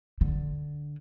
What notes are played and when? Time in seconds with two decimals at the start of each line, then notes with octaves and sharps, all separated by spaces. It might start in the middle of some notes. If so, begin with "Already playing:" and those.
0.21 D3